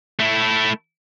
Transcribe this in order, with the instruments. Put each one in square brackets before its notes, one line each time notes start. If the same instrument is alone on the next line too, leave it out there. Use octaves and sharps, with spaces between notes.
[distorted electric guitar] A3 E4